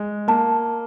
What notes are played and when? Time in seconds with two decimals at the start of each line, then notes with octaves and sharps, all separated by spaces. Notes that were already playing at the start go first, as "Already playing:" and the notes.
Already playing: G#3
0.28 A#3 A5